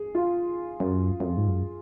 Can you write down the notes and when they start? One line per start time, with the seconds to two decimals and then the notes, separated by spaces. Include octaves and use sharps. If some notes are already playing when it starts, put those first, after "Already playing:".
Already playing: G#4
0.15 F4
0.80 F#2
1.20 F#2
1.25 F2
1.37 G#2
1.48 F#2